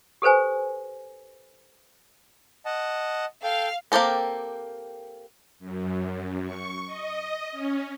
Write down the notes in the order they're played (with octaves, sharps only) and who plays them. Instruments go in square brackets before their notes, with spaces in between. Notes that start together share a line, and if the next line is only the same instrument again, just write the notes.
[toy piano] G4 A4 B4 C5 G#5
[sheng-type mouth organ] D#5 F#5 A5
[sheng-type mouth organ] A4 G5 [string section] F5
[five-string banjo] A#3 C4 G4 A4 A#4
[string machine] F#2
C#6
D#5
C#4